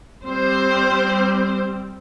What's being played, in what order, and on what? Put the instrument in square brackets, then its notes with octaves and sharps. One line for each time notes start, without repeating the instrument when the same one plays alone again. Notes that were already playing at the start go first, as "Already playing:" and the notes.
[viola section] G3 C4 C5